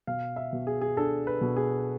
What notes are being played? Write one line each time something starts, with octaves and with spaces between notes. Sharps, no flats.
B2 F5
E5
B2
G#4
G#4
D4 A4
B4
B2
G#4